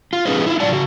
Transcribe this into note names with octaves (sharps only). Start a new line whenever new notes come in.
F4
B3 C#4 D#4 G#4 B4 C5
E4 F4
A2 F#3 F4 D5 F#5 A5
C#3 F#4